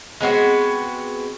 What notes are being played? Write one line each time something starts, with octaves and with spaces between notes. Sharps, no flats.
G#3 B3 C4 F#4